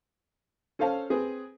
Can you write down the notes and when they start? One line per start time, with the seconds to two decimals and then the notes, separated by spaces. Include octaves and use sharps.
0.79 C#4 A4 C5 F5 A5
1.10 C4 G#4 B4